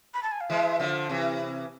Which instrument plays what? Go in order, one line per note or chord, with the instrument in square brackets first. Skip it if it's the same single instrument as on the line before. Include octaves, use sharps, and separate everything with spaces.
[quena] B5
A5
G#5
F5
[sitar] E3 G#3 [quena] E5
[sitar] D3 F3
C3 E3